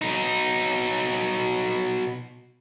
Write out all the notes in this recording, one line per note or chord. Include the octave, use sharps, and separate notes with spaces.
B2 D#4